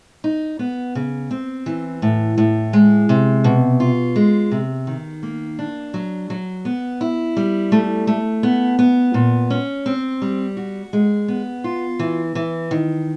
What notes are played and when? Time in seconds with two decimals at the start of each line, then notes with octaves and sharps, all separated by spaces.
0.24 D#4
0.59 B3
0.95 C#3
1.31 C4
1.66 E3
2.02 A2
2.38 A2
2.73 G#3
3.09 C3
3.44 B2
3.80 F4
4.16 G#3
4.51 C3
4.87 D#3
5.23 A#3
5.59 D4
5.94 F#3
6.30 F#3
6.65 B3
7.01 E4
7.37 G3
7.72 A3
8.07 A3
8.43 B3
8.79 B3
9.14 A#2
9.50 C#4
9.86 C4
10.22 G3
10.57 F#4
10.93 G#3
11.28 B3
11.64 F4
11.99 E3
12.35 E3
12.71 D#3